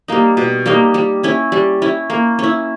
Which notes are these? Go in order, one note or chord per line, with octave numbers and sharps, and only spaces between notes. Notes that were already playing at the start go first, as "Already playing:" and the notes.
G3 A#3 D#4
B2
G3 A#3 D#4
G3
C#4 E4
G3
C#4 E4
A#3
C#4 E4